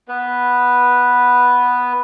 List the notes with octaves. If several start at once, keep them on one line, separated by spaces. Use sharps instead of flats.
B3 B4